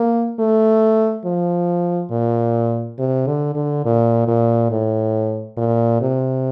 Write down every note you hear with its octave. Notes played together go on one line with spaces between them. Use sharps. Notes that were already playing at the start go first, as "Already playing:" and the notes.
Already playing: A#3
A3
F3
A#2
C3
D3
D3
A#2
A#2
A2
A#2
C3